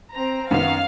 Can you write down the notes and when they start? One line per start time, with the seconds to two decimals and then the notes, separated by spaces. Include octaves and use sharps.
0.13 C4 A#5
0.51 F#2 D#3 B3 F5